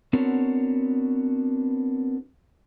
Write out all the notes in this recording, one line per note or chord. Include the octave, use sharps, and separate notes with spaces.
B3 C4 D4 F#4 A#4 C#5